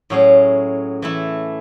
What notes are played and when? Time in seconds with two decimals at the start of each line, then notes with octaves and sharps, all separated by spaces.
0.10 A2 F#3 C#4 G#4
1.02 E3 A3 E4